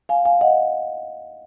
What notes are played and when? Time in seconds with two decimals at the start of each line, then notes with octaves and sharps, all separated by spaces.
0.09 F5 G#5
0.25 F5 G#5
0.41 D#5 F#5